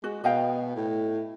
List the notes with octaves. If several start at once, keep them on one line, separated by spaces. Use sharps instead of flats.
G#3 F#4
B2 D#5 F5 G5
A2